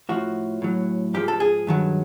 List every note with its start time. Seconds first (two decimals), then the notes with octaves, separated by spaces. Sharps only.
0.09 A2 F3 F#4
0.62 A2 F#3
1.14 G#2 F3 G4
1.28 A4
1.40 G#4
1.67 G2 D#3 F#3